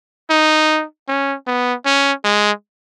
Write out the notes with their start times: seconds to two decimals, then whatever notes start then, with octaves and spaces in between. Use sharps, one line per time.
0.30 D#4
1.08 C#4
1.47 B3
1.86 C#4
2.24 G#3